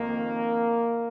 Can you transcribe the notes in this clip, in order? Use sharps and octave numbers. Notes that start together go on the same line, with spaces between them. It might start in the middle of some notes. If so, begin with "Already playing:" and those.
Already playing: F2 D#3 A#3